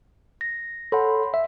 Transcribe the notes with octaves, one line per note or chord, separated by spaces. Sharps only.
A#6
A4 C#5 F#5 B5 C6
E5